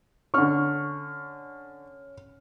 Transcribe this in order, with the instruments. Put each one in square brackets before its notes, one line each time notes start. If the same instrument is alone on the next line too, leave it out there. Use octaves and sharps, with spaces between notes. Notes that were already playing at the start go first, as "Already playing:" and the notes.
[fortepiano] D3 C#6 [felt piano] C#4 F6